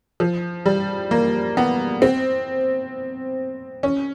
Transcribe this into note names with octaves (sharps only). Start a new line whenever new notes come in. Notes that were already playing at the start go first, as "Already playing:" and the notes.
F3
G3
A#3
B3
C4
C#4